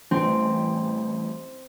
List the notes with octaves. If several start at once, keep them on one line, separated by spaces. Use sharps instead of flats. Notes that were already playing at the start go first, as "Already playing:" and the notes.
A1 G3 A3 C4 G4